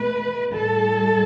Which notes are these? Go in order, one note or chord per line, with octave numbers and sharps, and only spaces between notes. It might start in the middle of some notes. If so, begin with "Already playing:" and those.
Already playing: B2 A3 B4
A2 G3 A4